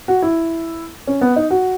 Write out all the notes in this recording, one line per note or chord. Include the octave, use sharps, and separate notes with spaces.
F#4
E4
C#4
B3
D#4
F#4